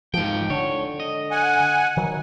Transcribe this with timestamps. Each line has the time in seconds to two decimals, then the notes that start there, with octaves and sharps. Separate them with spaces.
0.14 G#2 F3 G5
0.50 D3 C#5
1.00 D#5
1.31 F#5 G#5
1.97 D#3 F#3